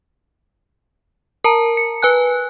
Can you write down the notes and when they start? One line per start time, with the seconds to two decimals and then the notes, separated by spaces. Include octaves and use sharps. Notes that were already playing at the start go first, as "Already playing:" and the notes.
1.44 A#4 A5 A#5
1.77 C#7
2.03 B4 G#5 F#6